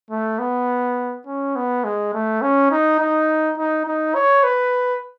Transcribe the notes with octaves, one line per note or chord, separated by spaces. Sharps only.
A3
B3
C#4
B3
G#3
A3
C#4
D#4
D#4
D#4
D#4
C#5
B4